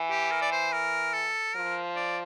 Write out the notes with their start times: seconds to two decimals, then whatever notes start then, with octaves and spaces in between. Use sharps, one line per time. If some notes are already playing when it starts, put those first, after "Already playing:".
Already playing: E3
0.10 G4
0.31 A#4
0.42 D5
0.52 C5
0.72 A#4
1.13 A4
1.55 F3 A#4
1.96 D5